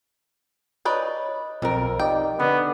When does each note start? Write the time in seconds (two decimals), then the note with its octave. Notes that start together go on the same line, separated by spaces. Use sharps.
0.85 D#4 B4 C#5 D5
1.62 B1 F2 F3 C4 A#4
1.99 D#4 G4 D5 G5
2.39 D3 B3